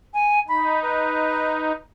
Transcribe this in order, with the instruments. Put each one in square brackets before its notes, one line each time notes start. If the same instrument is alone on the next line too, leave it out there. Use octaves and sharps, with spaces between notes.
[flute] G#5
[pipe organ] D#4 [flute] B5
[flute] B4